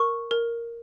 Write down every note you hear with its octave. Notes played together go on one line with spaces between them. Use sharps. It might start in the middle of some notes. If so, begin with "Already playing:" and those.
Already playing: A#4 C#6
A#4